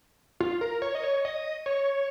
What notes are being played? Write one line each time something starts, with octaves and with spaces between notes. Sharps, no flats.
F4
A#4
C#5
D#5
C#5
D#5
C#5